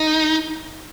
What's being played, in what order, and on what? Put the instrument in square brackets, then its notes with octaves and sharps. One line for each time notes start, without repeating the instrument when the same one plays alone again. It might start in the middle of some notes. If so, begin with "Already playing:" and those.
Already playing: [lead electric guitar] D#4